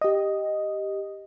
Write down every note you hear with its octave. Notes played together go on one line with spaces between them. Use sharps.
G4 D#5